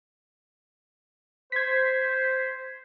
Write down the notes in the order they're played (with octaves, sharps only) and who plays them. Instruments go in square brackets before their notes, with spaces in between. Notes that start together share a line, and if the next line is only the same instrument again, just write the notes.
[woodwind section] C5 [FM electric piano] G#6 B6